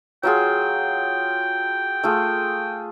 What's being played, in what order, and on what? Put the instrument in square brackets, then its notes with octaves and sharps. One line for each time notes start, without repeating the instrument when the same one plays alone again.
[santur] F#3 F4 G#4 [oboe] G5
[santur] A3 F4 G#4